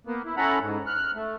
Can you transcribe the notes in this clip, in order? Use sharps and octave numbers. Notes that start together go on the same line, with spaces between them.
A#3 B3
E4
C#4 E4 A4 F#5 A#5 B5
G#2
F6 F#6
A3